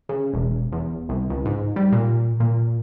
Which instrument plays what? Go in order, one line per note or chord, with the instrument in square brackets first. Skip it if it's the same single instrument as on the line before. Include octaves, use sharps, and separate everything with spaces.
[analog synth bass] C#3
E1
E2
C2
C#2
G#2
G3
A#2
A#2